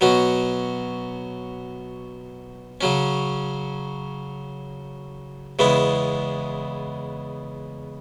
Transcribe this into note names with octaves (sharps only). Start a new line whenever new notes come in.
B2 F#3 C#4 F#4
C#3 F#3 C#4
E2 C#3 G#3 B3 E4